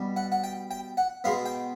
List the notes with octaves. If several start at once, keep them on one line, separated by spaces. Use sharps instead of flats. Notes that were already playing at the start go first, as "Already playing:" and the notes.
Already playing: B2 G3
F#5
F#5
G5
G5
F#5
B2 G#3 B3 F5
G5